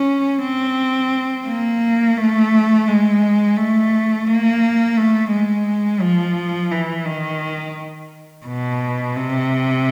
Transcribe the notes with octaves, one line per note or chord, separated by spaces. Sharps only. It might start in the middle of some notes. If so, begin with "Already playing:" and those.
Already playing: C#4
C4
A#3
A3
G#3
A3
A#3
A3
G#3
F3
E3
D#3
B2
C3